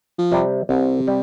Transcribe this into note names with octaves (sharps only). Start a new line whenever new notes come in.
F3
C3 G3
C2 C3
G3